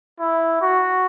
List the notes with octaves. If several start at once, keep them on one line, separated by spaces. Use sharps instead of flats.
E4
F#4